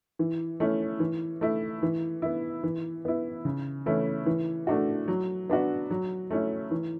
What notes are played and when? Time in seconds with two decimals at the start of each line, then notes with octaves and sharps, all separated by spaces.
0.19 E3
0.60 A3 C#4 E4
1.00 E3
1.41 A3 E4
1.83 E3
2.22 B3 E4
2.63 E3
3.05 B3 E4
3.45 C#3
3.86 E3 A3 C#4 E4
4.26 E3
4.67 A3 D4 F#4
5.08 F#3
5.49 B3 D4 F#4
5.91 F#3
6.30 A3 C#4 E4
6.71 E3